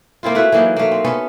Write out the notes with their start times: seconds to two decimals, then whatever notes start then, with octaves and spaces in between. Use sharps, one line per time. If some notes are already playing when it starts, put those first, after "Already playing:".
0.23 A#3 C4 E4 F4
0.35 A3 E4 F#4 B4
0.52 E3 F#3 A#3 D#4
0.77 A3 A#3
0.92 C4
1.05 B3 C#4 A4